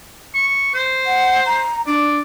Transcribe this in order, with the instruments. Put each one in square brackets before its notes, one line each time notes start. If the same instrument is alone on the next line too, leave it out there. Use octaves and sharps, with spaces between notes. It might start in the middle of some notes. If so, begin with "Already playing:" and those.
[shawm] C#6
C5
[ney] F#5
A#5
[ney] D4 [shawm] D5